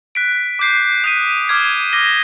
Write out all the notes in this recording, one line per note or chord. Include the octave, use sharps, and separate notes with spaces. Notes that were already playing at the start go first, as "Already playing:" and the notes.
F#6 B6 D7
D6 G6 C7
D#6 F#6 B6 D#7
D6 F6 G#6 C7
D6 F6 A#6 D#7 G7